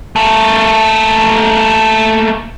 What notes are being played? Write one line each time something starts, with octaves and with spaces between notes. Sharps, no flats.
A3 A#3